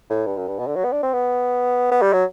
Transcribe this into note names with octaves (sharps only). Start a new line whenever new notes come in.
A2
G2
F#2
G2
B2
D3
F#3
B3
D4
C4
B3
B3
G3
F#3